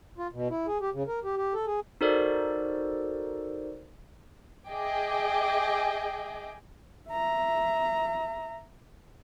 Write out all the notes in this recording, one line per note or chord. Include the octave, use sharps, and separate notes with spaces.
F4
B2
E4
G#4
G4
C#3
A#4
G4
G4
A4
G#4
D#4 F#4 A4 A#4 C5 D5
G#4 D#5 E5 G5 G#5 D6
E5 A#5